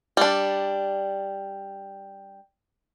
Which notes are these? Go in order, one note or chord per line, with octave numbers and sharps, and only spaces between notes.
G3 D4